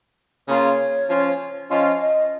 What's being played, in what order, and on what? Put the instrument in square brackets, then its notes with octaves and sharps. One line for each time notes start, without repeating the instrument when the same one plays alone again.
[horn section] C#3 A#3 F4 [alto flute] C#5
[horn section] F3 C#4 F4
[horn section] F3 C#4 F4 [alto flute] D#5
[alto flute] D#5